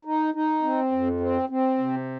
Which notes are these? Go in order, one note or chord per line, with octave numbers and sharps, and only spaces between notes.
D#4
D#4
C4
F2
C4
C4
C3